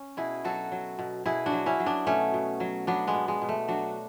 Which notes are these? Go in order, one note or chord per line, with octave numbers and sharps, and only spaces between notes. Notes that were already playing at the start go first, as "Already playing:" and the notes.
Already playing: C#4
B2 E4 G#4
F#3 F#4 A4
F#3
B2
B2 E4 G#4
D4 F#4
F#3
C#4 E4
F#3
B3 D4
B2 A3 C#4
B2
F#3
F#3 B3 D4
G#3 B3
B2
G#3
B2
A3
F#3 D4 F#4